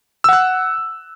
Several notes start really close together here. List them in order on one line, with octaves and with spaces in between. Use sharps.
E6 F#5 F#6